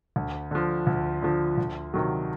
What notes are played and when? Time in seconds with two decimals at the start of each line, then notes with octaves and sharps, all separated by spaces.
0.16 D2
0.51 D3 F3
0.87 D2
1.22 D3 F3
1.58 D2
1.94 C3 D#3 F#3